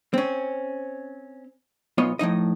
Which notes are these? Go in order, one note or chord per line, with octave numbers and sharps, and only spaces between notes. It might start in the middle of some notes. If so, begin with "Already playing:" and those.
C4 C#4
B1 B3 F4 C#5 D#5
A2 F3 D#4 D#5